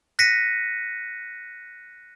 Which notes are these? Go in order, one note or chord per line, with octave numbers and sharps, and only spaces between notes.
F#6 A#6 B6 C#7 D#7